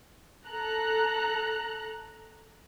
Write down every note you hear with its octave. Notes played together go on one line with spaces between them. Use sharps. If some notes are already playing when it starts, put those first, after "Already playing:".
A4 A#5 F#6